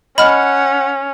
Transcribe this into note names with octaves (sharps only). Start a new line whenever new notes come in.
C#4 D#5 F#5 B5 F6